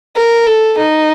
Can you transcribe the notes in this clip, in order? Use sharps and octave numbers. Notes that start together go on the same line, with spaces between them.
A#4
A4
D#4